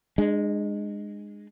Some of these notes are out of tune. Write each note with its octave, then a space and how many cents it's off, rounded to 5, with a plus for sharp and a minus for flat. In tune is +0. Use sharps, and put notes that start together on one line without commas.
G#3 -10 D4 +40